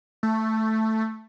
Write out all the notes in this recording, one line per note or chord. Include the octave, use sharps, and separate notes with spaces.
A3